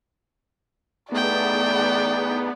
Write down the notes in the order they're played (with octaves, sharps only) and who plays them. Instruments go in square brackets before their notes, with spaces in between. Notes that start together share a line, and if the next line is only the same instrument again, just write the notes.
[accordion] E2 D#4 G#4 [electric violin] A3 G5 [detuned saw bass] B3 [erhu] D5